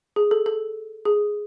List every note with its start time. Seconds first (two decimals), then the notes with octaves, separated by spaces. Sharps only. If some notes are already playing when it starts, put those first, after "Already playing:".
0.16 G#4
0.31 A4
0.46 A4
1.05 G#4